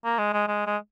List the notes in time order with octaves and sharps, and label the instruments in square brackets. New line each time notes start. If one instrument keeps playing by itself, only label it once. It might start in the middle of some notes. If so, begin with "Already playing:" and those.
[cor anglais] A#3
G#3
G#3
G#3
G#3